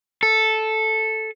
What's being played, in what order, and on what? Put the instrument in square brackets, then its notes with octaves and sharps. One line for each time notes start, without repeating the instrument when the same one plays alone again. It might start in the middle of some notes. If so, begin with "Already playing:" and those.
[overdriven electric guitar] A4